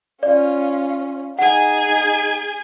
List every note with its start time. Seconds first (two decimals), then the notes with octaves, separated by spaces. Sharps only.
0.23 C#4 F4 D5
1.39 D#4 G#4 F#5 G#5